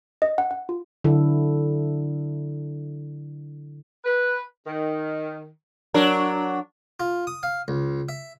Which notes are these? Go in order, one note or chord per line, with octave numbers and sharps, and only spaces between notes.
D#5
F#5
F#5
F4
D3 F#3 E4 A4
B4
D#3
F#3 D4 A#4
F4
D#6
F5
C#2
E5